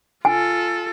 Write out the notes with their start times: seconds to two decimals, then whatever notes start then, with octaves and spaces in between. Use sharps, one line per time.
0.25 F4 A4 G#5